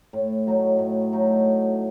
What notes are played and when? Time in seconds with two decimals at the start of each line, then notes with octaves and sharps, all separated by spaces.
0.13 A2
0.47 F#3 A3 D#4
0.79 A2
1.13 F#3 A3 D#4
1.45 A2